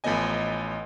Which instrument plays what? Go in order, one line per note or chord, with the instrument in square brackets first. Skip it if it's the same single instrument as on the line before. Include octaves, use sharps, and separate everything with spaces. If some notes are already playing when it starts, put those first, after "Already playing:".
[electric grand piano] A1 F3 A3 B3 D#5 G#5